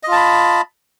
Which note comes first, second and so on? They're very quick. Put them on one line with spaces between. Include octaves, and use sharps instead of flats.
D#5 F4 A5 B5